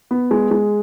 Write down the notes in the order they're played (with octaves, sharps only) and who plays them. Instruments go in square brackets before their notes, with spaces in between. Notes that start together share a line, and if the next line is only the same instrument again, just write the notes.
[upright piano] B3
G#3
G#3